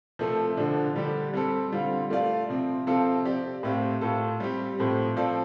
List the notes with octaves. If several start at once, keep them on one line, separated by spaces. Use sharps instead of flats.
C3 F3 A3 C4 A4
D3 F3 D4
D3 G3 D4 G4
G3 C4 A4
D3 G3 C4 F4
A3 F4 D5 F5
C3 F3 C4
C3 F3 C4 A4 F5
C4 G4 D5
A2 A3 C4 G4 F5
A2 A3 F4 A4
G3 C4 G4
A2 F3 C4
F3 C4 A4 D5 F5